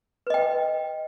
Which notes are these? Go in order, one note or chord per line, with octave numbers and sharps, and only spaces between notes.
B4 D#5 G5